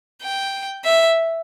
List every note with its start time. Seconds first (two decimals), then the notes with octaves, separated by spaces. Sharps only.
0.23 G5
0.85 E5